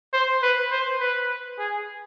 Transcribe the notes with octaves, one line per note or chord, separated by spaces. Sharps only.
C5
B4
C5
B4
G#4